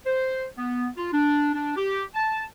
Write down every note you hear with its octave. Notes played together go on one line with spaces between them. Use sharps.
C5
B3
F4
D4
D4
G4
A5